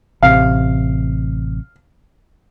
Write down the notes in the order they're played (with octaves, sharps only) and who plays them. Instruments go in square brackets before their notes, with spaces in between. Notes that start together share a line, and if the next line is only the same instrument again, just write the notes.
[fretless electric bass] A1 C3 [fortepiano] F5